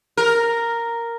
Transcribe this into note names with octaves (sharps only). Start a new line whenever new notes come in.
A#4